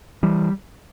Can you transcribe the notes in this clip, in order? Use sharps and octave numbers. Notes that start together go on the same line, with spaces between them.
E3 G3